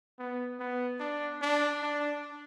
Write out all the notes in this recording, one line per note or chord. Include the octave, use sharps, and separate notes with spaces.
B3
B3
D4
D4
D4